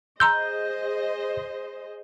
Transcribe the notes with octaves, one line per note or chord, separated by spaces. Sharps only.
G#4 C5 D#5 A#5 C6 E6 G6